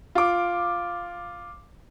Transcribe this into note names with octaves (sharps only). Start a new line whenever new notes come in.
F4 D6